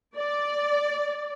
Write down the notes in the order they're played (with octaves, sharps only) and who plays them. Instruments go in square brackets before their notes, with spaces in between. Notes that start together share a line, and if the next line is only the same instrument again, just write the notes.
[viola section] D5